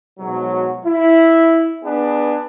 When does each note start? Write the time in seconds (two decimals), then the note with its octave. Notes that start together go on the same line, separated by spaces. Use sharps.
0.19 G#2 B2 F#3
0.86 E4
1.84 B3 D4 G#4 B4